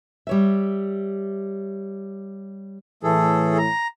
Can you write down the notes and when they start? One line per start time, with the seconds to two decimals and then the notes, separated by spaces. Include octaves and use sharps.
0.27 G3 C#5 E5
3.03 A2 E3 A3 G#4 A4
3.58 A#5